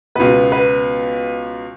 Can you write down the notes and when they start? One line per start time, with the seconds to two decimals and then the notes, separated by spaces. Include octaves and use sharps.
0.15 C#2 B2 B3 B4
0.52 B4